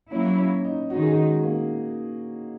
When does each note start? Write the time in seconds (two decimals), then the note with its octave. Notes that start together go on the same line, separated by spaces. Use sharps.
0.11 F#3 A#3 C#4 E4
0.38 C#4
0.65 D#4
0.90 D#3 G#3 D#4 F#4
1.02 G#4
1.14 F#4
1.44 A#3